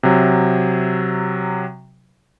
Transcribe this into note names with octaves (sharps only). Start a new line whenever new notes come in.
C3 F#3